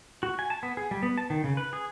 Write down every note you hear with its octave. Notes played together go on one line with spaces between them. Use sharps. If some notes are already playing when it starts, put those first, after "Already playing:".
F#4
G#5
A5
B3
G#4
G3
B3
A5
D#3
C#3
B4
G#4